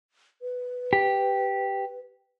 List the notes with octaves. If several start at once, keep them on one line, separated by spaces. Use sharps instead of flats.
B4
G4